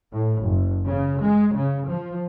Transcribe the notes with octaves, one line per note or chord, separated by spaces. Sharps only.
A2
F#1
C#3
G#3
C#3
F3